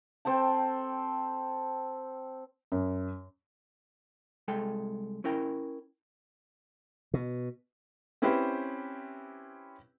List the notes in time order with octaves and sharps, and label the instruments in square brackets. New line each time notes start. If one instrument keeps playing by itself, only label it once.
[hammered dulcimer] C4 A4 G5 A5
[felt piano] F#2
[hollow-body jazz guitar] C2 G#3 A4 G5
C#4 E4 A#4 G5
[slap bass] B2
[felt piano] C4 C#4 E4 G4 B4 C5